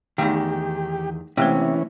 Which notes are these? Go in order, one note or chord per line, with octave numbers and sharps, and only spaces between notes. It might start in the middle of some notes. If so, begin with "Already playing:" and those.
E2 D#3 A3 D#4 G4
C3 E3 A3 A#3 C#4 C5